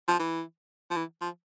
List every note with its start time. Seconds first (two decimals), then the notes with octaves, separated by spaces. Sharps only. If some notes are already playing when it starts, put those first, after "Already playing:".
0.08 F3
0.19 E3
0.91 F3
0.96 E3
1.21 F3